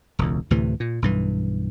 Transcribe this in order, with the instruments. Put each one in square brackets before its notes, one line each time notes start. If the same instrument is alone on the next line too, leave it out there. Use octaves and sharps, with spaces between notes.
[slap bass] E1 C#2
D2 A2 C3 E3
A#2
B1 G2 E3